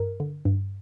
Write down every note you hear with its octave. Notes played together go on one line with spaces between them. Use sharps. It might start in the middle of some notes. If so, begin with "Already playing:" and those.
Already playing: G2 A#4
D3
G2